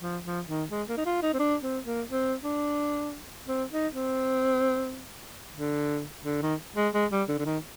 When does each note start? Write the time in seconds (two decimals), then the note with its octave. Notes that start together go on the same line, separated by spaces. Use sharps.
0.02 F3
0.24 F3
0.48 D#3
0.71 G#3
0.89 A#3
0.97 D#4
1.06 F4
1.22 D#4
1.34 C4
1.39 D4
1.63 C4
1.86 A#3
2.10 C4
2.44 D4
3.48 C4
3.72 D#4
3.94 C4
5.55 D3
6.25 D3
6.42 D#3
6.76 G#3
6.94 G#3
7.11 G3
7.28 D3
7.39 D3
7.46 D#3